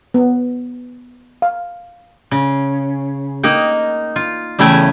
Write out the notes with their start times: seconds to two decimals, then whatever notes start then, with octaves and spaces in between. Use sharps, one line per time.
0.14 B3
1.42 F5
2.31 C#3
3.43 A#3 D#4 G5
4.16 F4
4.59 E2 C#3 A3 E4 G5 G#5